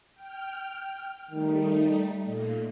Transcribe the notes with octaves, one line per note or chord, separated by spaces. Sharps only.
G5 F6
D#3 G3 A3 D#4
A#2 A3 A#3